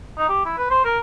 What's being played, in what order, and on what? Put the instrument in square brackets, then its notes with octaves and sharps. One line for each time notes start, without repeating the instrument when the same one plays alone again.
[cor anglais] D#4
G4
E4
B4
C5
A#4